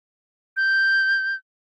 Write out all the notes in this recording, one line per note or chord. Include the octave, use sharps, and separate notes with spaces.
G6